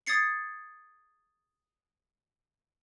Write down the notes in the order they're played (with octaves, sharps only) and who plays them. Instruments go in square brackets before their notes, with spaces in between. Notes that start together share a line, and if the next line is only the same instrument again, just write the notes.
[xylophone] D#6 G#6 A6 C7 C#7